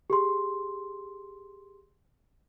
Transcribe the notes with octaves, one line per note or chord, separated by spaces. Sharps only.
G4 G#4 C6